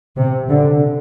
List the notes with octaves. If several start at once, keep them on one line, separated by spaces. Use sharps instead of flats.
C3
D3